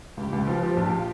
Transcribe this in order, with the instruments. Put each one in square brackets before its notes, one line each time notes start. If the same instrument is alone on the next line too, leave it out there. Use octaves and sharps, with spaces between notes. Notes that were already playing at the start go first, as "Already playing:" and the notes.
[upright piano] C#2 [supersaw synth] G4
[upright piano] C#2
[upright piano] F3 [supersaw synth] F4
[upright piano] F3
A#1